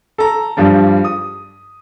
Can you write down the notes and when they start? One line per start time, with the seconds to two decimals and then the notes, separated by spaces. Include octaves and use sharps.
0.18 A4 A#5
0.57 G2 F3 G3 D4
1.04 D#6